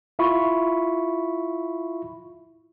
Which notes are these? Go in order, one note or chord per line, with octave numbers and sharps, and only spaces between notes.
E4 F4 E5 B5 C#6